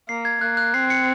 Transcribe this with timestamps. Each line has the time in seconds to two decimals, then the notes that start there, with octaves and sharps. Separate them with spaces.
0.09 A#3 C7
0.25 G#6
0.41 A#3 F#6
0.57 F#6
0.74 C4 C7
0.90 C#7